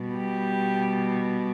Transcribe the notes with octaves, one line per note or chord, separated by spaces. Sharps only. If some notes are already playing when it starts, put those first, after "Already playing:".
Already playing: B2 G3
G4